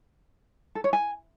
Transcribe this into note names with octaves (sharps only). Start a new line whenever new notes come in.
A4
C#5
G#5